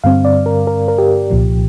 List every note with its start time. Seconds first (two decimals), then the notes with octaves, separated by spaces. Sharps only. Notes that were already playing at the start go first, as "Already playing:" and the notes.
0.04 G2 D3 G3 C4 F5
0.25 D5
0.46 A#4
0.67 A#4
0.88 A#4
0.98 G4
1.31 C2 A#2 F3